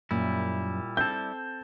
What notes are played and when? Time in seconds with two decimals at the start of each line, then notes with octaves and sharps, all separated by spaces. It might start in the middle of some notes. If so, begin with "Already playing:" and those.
0.11 F#2 A#2 G3 E4
0.97 C4 A4 G6